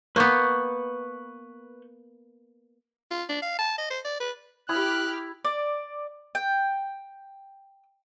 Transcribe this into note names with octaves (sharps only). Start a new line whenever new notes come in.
A#3 B3 B4 C#6 G6
F4
D4
F5
A5
D#5
C5
D5
B4
E4 G4 B5 D#6 F6 F#6
D5
G5